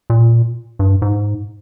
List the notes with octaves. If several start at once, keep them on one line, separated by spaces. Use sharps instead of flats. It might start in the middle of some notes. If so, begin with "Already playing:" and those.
A#2
G2
G#2